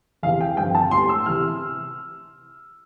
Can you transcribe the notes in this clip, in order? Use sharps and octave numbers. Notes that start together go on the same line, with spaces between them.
E2 C3 E3 F5
G5
G2 D3 F3 C4 G5
A5
A2 G3 B3 C6
E6
C3 E3 F6